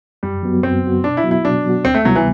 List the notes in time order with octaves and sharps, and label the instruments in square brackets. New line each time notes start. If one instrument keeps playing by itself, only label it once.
[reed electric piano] F#2 [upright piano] G3
[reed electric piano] F#3 B3 F#4
[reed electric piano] F#2 [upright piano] C4
[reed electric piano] F#3 B3 F#4
[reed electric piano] B2 [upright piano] D4
[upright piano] E4
[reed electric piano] F#3 B3 F#4
[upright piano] E4
[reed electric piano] B2 [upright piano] D4
[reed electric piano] F#3 B3 F#4
[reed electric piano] D2 [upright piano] C4
[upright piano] A3
[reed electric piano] C3 G3 B3 E4 [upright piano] F#3
[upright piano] E3